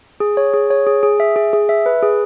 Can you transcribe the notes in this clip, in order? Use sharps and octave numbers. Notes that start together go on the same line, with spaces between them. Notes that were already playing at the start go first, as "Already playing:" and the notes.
G#4
C#5
G#4
C#5
G#4
G#4
E5
G#4
G#4
E5
B4
G#4